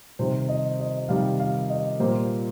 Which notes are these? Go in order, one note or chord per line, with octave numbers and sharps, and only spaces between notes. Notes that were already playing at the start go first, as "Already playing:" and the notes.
C3 D#3 G3 C5
D#5
D#5
C3 D#3 G3 F5
F5
D#5
A#2 G3 A#3 C5